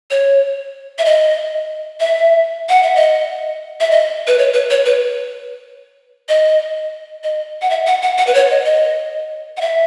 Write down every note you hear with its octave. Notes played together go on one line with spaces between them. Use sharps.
C#5
E5
D#5
E5
F#5
E5
D#5
E5
D#5
B4
C#5
B4
C#5
B4
D#5
D#5
F#5
E5
F#5
F#5
F#5
B4
C#5
D#5
D#5
F#5
E5